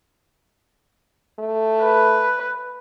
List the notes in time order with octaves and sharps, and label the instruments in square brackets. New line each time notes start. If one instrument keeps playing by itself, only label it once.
[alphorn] A3
[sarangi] B4